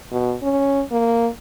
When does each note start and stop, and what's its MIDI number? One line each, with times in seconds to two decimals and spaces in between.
0.11 0.35 47
0.42 0.82 61
0.91 1.28 58